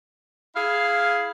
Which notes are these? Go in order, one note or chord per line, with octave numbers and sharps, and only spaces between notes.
E4 G#4 F5